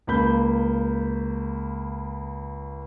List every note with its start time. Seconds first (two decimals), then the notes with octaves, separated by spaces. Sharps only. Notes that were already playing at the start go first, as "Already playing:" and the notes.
0.07 C#2 A#3 B5 G6